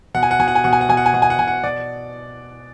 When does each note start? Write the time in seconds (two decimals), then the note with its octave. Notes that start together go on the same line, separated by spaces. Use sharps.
0.14 B2 F#5
0.23 G#5
0.31 F#5
0.39 B2 G#5
0.48 F#5
0.55 G#5
0.64 B2 F#5
0.73 G#5
0.81 F#5
0.89 B2 G#5
0.97 F#5
1.06 G#5
1.14 B2 F#5
1.22 G#5
1.30 F#5
1.39 B2 G#5
1.47 F#5
1.64 B2 D5